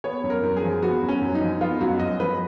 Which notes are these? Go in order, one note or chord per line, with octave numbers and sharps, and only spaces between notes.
B3 C#5
F#2
A#4
F#2
G#4
F3
B3 F#4
F#2
C#4
F#2
D#4
F3
B3 F4
F#2 F#4
F#2 D#5
F3 B4